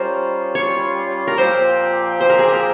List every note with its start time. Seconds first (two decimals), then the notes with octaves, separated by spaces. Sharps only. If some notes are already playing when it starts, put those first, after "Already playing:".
Already playing: G3 C#4 F4 A#4 C5
0.55 C#5
1.28 A#4
1.38 A#2 F3 C4 G4 C5
2.20 C5
2.30 A#4
2.39 G#4
2.48 A#4